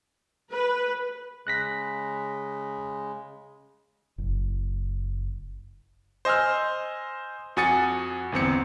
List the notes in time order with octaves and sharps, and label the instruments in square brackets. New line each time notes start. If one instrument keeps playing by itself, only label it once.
[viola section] B4
[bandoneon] C#3 G#3 [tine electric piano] F#6 A#6 B6
[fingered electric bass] F#1
[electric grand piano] C5 D#5 G#5 E6 F6
F2 F#4 G#5 D#6 A6 C#7
G1 E2 C4 C#7